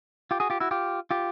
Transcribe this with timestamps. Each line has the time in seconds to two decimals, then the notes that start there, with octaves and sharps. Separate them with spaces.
0.31 F4 G4
0.40 F#4 G#4
0.50 F4 G4
0.60 E4 F#4
0.71 F4 G4
1.11 F4 G4